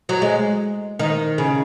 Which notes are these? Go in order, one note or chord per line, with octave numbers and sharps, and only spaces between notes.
F#3
G#3
D#3
C#3